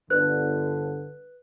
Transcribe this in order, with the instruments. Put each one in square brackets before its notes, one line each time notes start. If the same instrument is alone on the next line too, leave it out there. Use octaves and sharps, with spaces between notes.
[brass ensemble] G1 D3 [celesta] B4 F#6